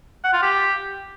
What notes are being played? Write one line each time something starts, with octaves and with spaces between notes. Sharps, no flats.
F#5
F4
G4